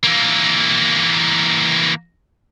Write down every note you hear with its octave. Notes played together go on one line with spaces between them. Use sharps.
E3 A#3